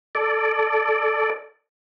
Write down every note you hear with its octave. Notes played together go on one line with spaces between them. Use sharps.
A4 D5